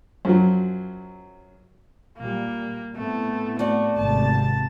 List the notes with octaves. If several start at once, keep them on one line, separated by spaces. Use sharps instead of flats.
F#2 F3 F#3
A#2 G3 A#3
A2 A3 B3 C4
A3 F#4 D5
G#1 C3 A5